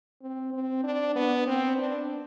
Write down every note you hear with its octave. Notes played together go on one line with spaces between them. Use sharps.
C4
C4
D4
B3
C4
D4